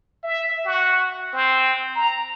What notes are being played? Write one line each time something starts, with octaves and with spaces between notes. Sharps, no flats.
E5
F#4
C4
A#5